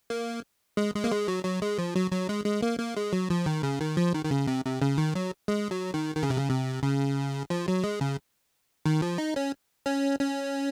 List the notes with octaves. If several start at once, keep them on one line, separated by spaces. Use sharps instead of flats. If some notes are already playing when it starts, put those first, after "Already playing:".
A#3
G#3
G#3
A#3
G#3
F#3
F#3
G#3
F3
F#3
F#3
G#3
G#3
A#3
A#3
G#3
F#3
F3
D#3
C#3
D#3
F3
D#3
D#3
C#3
C3
C3
C#3
D#3
F#3
G#3
F#3
D#3
D#3
C#3
C3
C#3
C3
C#3
F3
F#3
G#3
C#3
D#3
F3
D#4
C#4
C#4
C#4